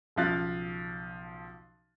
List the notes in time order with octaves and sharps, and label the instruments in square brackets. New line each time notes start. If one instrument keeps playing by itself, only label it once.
[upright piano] B1 C#3 F3 F5 F#6 A6